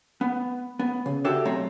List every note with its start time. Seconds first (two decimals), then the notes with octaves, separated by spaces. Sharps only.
0.21 B3
0.79 B3
1.06 C#3
1.25 D4 F#4 G4 A4 E5
1.45 B1 A3 C4 C#5 A#5